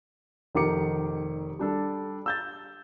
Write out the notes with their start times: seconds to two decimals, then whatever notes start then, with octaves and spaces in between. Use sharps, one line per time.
0.55 F1 D#3 G4 D6 C#7
1.59 G3 D4 A4
2.26 E6 G6 A6